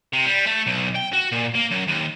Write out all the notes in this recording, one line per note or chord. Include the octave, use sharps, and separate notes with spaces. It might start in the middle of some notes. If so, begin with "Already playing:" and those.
C3
G3
A3
B1
G5
F#4
A#2
A#3
F#2
D#2